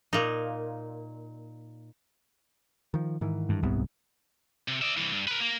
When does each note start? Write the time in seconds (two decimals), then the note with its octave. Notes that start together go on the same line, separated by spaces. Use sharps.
0.13 A#2 D#4
2.94 D#3 F3
3.21 G#2 D#3 E3
3.49 G2
3.63 D#1 C2 G#2 C3 B3
4.68 C3
4.82 D5 E5
4.97 C2 E3
5.12 G2
5.28 A#4 B4
5.40 A#3